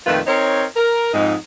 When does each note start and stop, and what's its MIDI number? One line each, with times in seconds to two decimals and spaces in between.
0.07 0.20 41
0.07 0.20 46
0.07 0.20 51
0.07 0.20 57
0.07 0.20 65
0.07 0.20 71
0.27 0.64 60
0.27 0.64 63
0.27 0.64 70
0.27 0.64 73
0.76 1.12 70
1.13 1.36 41
1.13 1.36 44
1.13 1.36 63